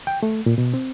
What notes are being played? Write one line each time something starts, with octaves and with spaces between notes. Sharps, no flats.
G5
A3
A#2
B2
C4